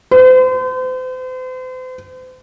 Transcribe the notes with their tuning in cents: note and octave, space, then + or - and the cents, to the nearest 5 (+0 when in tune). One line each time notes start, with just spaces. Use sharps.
C5 -40